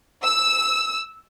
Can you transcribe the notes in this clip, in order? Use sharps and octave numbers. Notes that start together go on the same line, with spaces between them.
E6